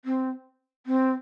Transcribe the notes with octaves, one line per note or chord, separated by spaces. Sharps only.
C4
C4